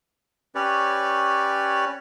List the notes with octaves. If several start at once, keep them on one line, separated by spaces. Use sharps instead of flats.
C#4 G4 B4 C#5 D5